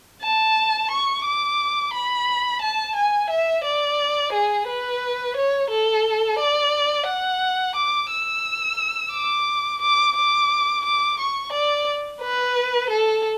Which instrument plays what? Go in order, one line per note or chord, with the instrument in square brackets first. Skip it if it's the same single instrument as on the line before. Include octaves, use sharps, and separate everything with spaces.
[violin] A5
C#6
D6
B5
A5
G#5
E5
D5
G#4
B4
C#5
A4
D5
F#5
D6
E6
D6
D6
D6
D6
C#6
D5
B4
A4